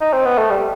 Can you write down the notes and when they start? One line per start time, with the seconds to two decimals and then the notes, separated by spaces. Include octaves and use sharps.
0.01 D#4
0.13 C4
0.25 B3
0.38 A3
0.50 G3